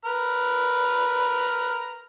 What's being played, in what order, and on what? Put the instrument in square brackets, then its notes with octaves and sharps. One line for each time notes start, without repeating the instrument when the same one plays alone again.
[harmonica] B4 A#5 F6